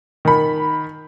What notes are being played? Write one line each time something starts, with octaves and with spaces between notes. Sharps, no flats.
D#3 B5